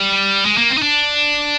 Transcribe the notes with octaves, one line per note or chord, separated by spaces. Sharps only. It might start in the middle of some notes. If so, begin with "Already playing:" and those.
Already playing: G3
G#3
A#3
C4
D#4
D4